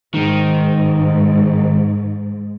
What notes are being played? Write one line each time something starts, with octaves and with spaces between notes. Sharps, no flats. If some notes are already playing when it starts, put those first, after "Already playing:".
G#2 D#3